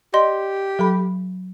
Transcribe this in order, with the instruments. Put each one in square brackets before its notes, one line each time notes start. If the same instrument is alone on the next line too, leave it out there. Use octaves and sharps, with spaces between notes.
[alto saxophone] G4 [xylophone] D5 D#5 C6
[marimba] F#3 A4 B5